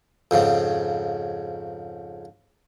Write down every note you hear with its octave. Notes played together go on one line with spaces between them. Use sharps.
F2 G#2 C#3